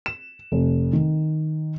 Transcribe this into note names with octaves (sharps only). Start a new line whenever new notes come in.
E7
F1
D#3